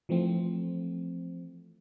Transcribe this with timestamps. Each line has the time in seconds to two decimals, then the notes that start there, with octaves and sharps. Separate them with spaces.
0.09 E3 F3 A3 C4